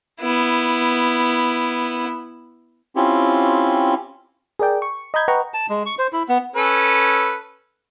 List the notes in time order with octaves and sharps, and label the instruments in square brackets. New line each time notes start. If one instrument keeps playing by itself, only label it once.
[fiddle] B3 E4
[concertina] C4 C#4 E4 F4 G4
[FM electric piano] G#4 A#4 D5 G5
C#6
D#5 A#5 B5 G6 G#6
B4 D#5 F#5 G5 A#5 C#6
[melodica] A5
G#3
C#6
C5
E4
B3
[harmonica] C#4 A4 B4